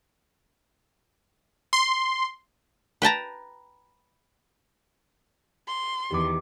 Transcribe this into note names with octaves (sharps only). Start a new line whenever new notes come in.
C6
B4 G5 A5 A#5
C6
E2 D#3 G4 D6